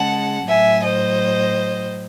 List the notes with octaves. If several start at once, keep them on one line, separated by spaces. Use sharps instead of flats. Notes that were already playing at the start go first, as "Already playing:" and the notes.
Already playing: C#3 G#3 F#5 A5
A2 F#3 E5 G#5
C5 D#5